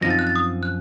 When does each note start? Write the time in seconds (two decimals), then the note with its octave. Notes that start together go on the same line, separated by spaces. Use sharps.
0.01 F#2 F3 C4 D#4 A#6
0.10 A6
0.19 F#6
0.27 A6
0.36 D#6
0.63 F#6